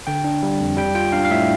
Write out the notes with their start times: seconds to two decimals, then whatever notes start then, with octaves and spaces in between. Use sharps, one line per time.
0.07 D3 G5
0.24 D4
0.43 G3
0.60 F2
0.77 G3 G5
0.95 F4 G5
1.12 D4 F5
1.25 F5
1.30 A2 E5